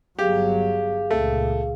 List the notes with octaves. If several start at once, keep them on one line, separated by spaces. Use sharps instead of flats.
G1 F#3 G4 G#4 F5
C#2 A#2 A3